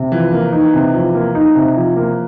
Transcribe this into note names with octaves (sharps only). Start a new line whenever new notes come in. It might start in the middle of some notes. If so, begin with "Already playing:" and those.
Already playing: C3
E3 F3
A#3
D#4
C3
F3
A#3
D#4
C3
F3
A#3